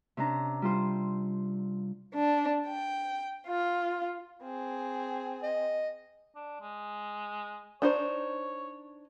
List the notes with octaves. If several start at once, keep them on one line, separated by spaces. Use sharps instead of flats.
C3 C#4 D4 A#5
G3 F4 C5
D4
G5
F4
C4 G#4
D#5
D4
G#3
D4 D#4 C5 C#5